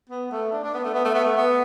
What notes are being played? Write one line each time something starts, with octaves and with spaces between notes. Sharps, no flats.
B3
A3
D4
D4
B3
A3
B3
A3
B3
A3
B3